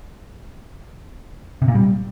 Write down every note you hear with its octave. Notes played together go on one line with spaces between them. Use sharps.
C3
A#2
G3